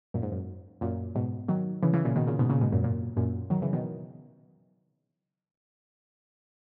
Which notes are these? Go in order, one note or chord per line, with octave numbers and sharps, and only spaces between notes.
F#2 A#2
G#2
F#2
F#2 A#2
G#2 B2
D#3 F#3
C#3 E3
C#3 E3
A#2 C#3
B2 D#3
A#2 C#3
G#2 B2
A#2 C#3
G#2 B2
F#2 A#2
F#2 A#2
F#2 A#2
D#3 F#3
C#3 E3
B2 D#3